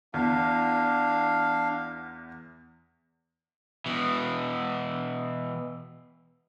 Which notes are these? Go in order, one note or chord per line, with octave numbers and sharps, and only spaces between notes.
E2 D4 F5
B2 E3